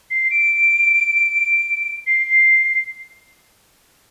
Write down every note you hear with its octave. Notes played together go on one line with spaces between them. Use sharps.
C7
D7
C7